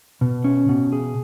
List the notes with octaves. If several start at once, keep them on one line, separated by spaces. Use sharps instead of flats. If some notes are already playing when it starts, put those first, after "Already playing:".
B2
C#4
B2
G#4